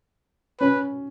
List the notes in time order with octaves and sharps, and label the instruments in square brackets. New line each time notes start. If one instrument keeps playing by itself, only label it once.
[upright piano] C#4 [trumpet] B4